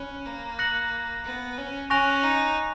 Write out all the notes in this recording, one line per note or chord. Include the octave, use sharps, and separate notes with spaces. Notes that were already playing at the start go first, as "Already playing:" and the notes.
Already playing: C#4 B5 F#6
A#3
F#6 A#6 C#7 F#7
B3
C#4
C#4 G#5 C#6 F#6 A#6 F7
D#4